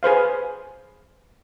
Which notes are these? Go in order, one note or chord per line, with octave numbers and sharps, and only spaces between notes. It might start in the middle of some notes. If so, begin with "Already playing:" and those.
G#4 B4 C5 F5